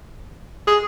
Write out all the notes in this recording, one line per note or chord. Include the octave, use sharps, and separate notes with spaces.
G#4